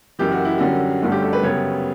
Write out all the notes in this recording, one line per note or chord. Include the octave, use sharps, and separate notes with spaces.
F#1 F#2 E3 G4
F#4
E4
F#2 D3 G3 C#4 F#4
G1 G2 D3 A3 C#4 F#4
G4
A4
B4
F#2 C#3 G3 B3 C#5